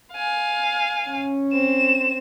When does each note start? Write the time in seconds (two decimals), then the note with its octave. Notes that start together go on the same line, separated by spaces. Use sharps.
0.13 F5 G#5
1.08 C#4
1.53 C4 E7